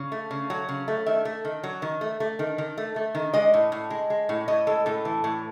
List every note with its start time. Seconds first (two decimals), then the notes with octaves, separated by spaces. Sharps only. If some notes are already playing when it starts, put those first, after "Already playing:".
Already playing: C#3
0.12 A3
0.31 C#3
0.50 F#3
0.69 C#3
0.88 A3
1.06 D#3 E5
1.25 A3
1.45 D#3
1.64 F#3
1.82 D#3
2.01 A3
2.20 A3
2.39 D#3
2.58 D#3
2.78 A3
2.96 A3
3.15 D#3
3.34 G#3 D#5
3.54 A2
3.72 A2
3.90 G#3
4.10 G#3
4.29 A2
4.48 A2 D#5
4.67 G#3 A4
4.86 A2 A4
5.05 E3
5.24 A2